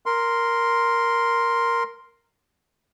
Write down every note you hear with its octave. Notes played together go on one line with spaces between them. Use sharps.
A#4 C6